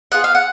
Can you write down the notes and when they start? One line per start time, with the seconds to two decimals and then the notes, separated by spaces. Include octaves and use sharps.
0.12 B3 F4 G#4 F#5
0.24 F5
0.35 F#5